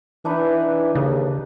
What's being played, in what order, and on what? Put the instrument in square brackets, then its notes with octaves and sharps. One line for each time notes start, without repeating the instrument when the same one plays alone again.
[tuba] E3 [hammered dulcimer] D4 D#4 B4
[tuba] D#2 [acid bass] C#3